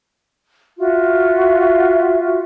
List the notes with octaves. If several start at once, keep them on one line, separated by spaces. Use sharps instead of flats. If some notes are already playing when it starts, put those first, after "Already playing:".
F4 F#4 E5